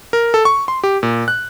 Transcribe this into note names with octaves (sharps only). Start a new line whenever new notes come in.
A#4
A4
C#6
C6
G4
A#2
F#6